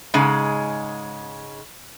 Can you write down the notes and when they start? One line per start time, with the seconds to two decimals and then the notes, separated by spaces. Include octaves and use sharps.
0.14 G#2 C#3 G#3